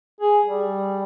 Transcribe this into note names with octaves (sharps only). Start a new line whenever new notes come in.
G#4
G3